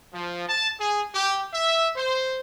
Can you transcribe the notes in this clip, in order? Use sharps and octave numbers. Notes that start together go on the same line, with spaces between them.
F3
A5
G#4
G4
E5
C5